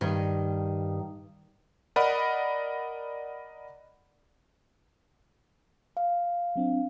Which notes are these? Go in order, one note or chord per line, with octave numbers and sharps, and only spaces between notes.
G2 D#3
A#4 D5 D#5 F#5 B5
F5
F#3 C4 D4